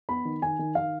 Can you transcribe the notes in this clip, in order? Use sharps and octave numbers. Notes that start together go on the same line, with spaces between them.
B3 B5
D#3
D#3 G#5
D#3
D#3 F5